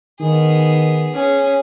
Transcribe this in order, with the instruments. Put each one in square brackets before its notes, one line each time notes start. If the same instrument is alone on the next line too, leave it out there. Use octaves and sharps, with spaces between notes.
[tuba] D#3 [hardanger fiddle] B3 G#4
[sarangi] C#4 [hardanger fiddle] G#4